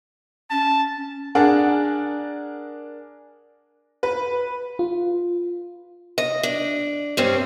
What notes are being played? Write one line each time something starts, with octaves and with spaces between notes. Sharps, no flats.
C#4 A5
D4 G#4 A#4 D5 F#5
B4
F4
D#5
D4
G2 C4 C#4